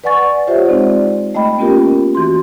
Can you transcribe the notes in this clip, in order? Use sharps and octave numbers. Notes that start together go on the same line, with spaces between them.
B4 D5 F#5 G#5 C#6 A6
F4 G4 C5 C#5 E5 F#5
G#3 C4 D#4 C5 D5
A3 D#5 G5 B5
A#3 B3 C#4 F4 G4 A#4
E3 F#4 C6